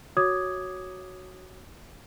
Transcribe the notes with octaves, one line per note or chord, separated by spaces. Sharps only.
F#4 C#5 D6 D#6 G#6